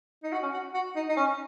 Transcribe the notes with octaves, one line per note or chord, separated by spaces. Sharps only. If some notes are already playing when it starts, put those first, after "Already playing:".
D#4
F#4
C#4
F#4
F#4
D#4
D#4
C#4